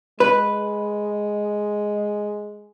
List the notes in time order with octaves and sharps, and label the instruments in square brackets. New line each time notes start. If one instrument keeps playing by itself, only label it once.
[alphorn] G#3 [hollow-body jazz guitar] B4